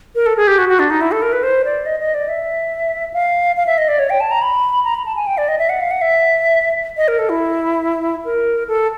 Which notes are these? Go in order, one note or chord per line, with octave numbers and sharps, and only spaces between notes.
A#4
A4
G#4
G4
F#4
F#4
D4
D#4
E4
A4
A#4
B4
C5
D5
D#5
D#5
D5
E5
F5
F5
E5
D#5
D5
C#5
G5
A5
A#5
B5
A#5
B5
A5
G#5
G5
D5
D#5
E5
F#5
F5
F#5
E5
D#5
A#4
A4
E4
A#4
A4